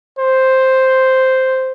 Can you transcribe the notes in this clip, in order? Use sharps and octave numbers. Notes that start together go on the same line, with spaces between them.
C5